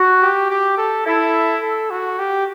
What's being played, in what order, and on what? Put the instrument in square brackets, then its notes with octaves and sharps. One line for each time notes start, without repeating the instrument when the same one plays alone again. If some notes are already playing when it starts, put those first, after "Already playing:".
Already playing: [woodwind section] F#4
[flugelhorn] G4
G4
A4
[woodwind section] E4 [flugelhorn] A4
[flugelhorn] A4
F#4
G4